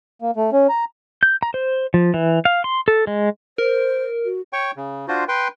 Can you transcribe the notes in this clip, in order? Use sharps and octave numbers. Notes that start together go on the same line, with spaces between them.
A#3
A3
C#4
A#5
G6
A#5
C5
F3
E3
F5
C6
A4
G#3
A#4 C5
F#4
C#5 G5 C#6
C#3
D4 F4 F#4 C5
B4 G5 C6